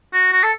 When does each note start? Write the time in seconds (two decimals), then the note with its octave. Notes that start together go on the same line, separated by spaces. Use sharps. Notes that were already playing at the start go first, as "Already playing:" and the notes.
0.13 F#4
0.32 F#4
0.43 A4